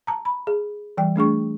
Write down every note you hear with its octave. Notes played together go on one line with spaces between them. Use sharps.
A5 A#5
B5
G#4
E3 G3 G5
A3 D4 G#4 C#6